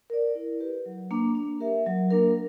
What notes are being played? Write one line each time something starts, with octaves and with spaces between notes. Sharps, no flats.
A#4 D5
E4
G4 B4
F#3
A#3 D4
D4
G4 A#4 E5
F#3
A#3 D4 A#4